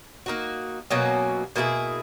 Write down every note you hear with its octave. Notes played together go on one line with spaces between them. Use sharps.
A#3 D#4 F#4
B2 F#3 A#3 C#4
B2 A#3 E4 G#4